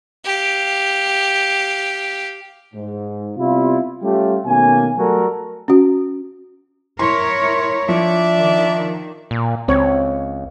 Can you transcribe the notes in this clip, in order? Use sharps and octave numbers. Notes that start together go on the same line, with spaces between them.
G4 F5
G#2
C3 G3 B3 E4 F4
G3 A3 C#4 F4 G4
B2 D#3 A3 A#3 C#4 G#5
F#3 G3 A3 F#4 A4 A#4
C#4 F#4
E4 A#4 C#5 C6
F3 D4 D5 E5
D#3
A#2
C#2 C4 C#5